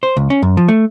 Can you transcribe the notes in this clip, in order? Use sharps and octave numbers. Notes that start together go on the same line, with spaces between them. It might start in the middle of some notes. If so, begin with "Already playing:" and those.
C5
C#2
C#4
F#2
F3
A3